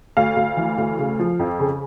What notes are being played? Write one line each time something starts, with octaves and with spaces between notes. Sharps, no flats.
D2 F5
D2
E3
D2
C#3
F3
F2
C#3